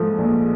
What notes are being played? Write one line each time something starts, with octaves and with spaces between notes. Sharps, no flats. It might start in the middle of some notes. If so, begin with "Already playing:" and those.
Already playing: G#2 F3 A3
A#1